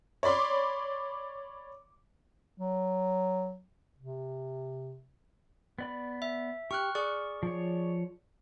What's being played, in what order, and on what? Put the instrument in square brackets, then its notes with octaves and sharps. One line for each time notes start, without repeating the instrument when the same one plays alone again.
[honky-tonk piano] C#5 D5 B5 C6 D6
[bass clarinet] F#3
C3
[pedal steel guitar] B3 D5 B5
[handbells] E5
[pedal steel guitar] G4 [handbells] C#6 F6 F#6
[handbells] G#4 D5 C#6 [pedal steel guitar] F6
[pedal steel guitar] F3 C#5